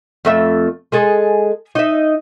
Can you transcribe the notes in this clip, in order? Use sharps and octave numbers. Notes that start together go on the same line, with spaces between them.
F2 A3 E5
G#3 G#4 A4
D#4 E5